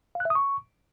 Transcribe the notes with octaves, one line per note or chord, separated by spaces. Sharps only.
F5
F#6
E5
D#6
C#6